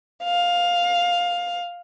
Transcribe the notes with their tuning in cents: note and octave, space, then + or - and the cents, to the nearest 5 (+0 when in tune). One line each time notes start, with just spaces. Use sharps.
F5 +10